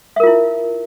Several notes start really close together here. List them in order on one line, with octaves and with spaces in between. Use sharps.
E5 A#4 F4 E4